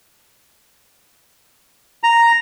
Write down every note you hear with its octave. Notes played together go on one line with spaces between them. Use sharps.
A#5